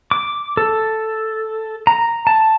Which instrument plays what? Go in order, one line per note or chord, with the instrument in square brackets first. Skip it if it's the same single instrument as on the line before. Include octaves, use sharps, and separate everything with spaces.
[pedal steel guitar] D6
A4
A#5
A5